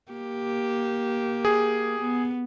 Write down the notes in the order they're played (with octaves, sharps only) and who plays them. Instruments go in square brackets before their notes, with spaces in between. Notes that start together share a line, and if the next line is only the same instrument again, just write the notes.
[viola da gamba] A#3 G4
[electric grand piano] G#4
[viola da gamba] B3